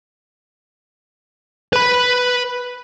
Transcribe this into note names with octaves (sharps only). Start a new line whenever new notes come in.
B4 B5